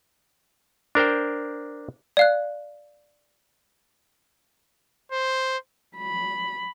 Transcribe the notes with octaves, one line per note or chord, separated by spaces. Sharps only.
D4 A#4 C5 G5
D5 F5 F#6
C5
B5